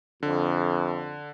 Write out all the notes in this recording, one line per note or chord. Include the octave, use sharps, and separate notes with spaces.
F2 D3